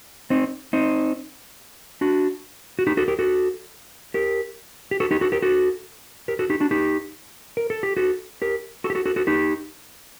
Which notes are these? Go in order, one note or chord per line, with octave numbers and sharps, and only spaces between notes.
C4 D#4
C4 D#4
D4 F#4
F#4
D#4 G4
F#4 A4
G4 A#4
F#4 A4
G4 A#4
G4
F#4 A4
D#4 G4
F#4 A4
G4 A#4
F#4 A4
G4 A#4
F#4 A4
D#4 G4
D4 F#4
D#4 G4
A#4
A4
G4
F#4 A4
G4 A#4
F#4 A4
G4
F#4 A4
F#4 A4
F#4 A4
D#4 G4